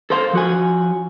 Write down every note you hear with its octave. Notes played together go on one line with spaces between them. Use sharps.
A4 A#4 C5 F5
F3 F#4 G#5